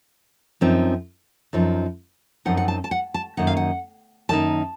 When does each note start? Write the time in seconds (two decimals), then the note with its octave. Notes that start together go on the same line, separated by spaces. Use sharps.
0.61 F#2 F3 C4 D#4
1.53 F#2 F3 C4 D#4
2.45 F#2 F3 C4 D#4 F#5
2.57 F#5
2.68 A5
2.84 A5
2.91 F#5
3.14 A5
3.37 F#2 D#3 A#3 D#4 F#5
3.47 F5
3.57 F#5
4.29 F#2 D#3 A#3 D#4 A5